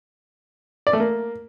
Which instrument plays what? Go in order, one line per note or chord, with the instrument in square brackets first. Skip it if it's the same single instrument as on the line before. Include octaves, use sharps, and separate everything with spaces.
[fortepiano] D5
A3
A#3